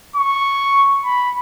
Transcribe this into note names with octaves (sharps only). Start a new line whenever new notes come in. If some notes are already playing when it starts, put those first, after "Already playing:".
C#6
B5